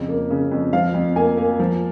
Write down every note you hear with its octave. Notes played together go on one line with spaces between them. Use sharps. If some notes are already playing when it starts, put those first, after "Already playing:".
Already playing: F2 C#3
A#3
C#3
F2
F3 F5
F2
A#3 G#5
A#3
F3